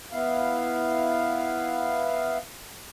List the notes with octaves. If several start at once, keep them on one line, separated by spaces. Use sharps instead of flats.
B3 E4 F5